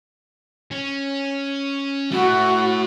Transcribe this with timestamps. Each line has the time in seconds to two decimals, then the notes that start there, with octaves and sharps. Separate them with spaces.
0.71 C#4
2.11 A3 E4 F#4